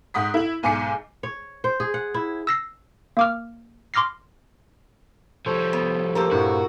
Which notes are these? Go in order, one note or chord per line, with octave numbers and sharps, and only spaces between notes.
G#2 F#5 D#6 B6
E4 F#7
B1 G#2 G#5 D6 C7 C#7
C#5
C5
G#4
F#5
E4
E6 A#6 C7
A#3 D6 F6
C6 D6 F6 A#6 C7
F3 G3 A4 C5 C#5
B3
A#3 G4 A#4 A5 C6 E6
G2 A#2 E4 F#4